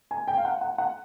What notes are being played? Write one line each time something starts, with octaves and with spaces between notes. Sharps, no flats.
G#5
G5
F5
F#5
F#5
F#5